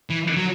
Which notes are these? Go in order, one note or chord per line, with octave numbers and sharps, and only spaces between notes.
E3
F#3